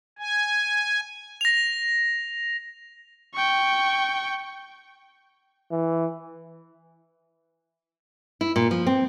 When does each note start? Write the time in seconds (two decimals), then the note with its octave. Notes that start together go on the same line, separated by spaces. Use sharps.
0.19 G#5
1.41 A#6 F7
3.35 G5 C#6
5.71 E3
8.41 E4
8.56 A#2
8.71 F3
8.87 C4